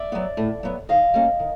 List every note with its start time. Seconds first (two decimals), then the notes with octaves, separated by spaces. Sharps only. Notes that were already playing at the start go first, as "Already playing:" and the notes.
Already playing: D5 E5
0.12 F#3 B3
0.37 A2
0.63 F#3 B3
0.89 D#3 D#5 F5
1.14 G3 A#3 C#4
1.39 D#3